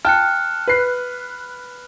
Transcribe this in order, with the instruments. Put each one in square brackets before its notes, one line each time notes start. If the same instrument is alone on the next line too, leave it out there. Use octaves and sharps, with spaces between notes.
[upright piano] G5 A5 [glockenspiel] F6 F#6 C#7
[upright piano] B4 C7